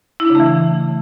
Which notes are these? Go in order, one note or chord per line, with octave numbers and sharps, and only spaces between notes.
C#3 E3 A3 D4 E4